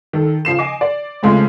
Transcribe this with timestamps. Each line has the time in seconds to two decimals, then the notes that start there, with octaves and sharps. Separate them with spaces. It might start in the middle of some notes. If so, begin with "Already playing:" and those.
0.13 D#3 A4
0.45 C#3 F3 C7 E7
0.59 D#5 G#5 D6
0.81 D5
1.23 C#3 F3 G#3 A3 C4